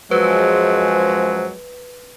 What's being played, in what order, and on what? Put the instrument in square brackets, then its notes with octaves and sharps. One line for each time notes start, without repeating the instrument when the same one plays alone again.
[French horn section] F#2 F3 G#3 [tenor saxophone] F#3 [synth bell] B4 [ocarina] C5